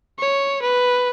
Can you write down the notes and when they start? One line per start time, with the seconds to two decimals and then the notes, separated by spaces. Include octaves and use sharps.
0.19 C#5
0.62 B4